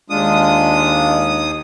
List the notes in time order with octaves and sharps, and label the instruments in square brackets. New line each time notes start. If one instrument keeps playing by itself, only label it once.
[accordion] D#2 D#6 [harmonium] G#3 D4 F4